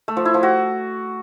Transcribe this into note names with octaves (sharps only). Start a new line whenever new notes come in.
A3
F3
E4
F3
F#4